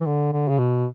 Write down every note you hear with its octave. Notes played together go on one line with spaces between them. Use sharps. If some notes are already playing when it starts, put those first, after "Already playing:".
E3
D3
D3
C#3
B2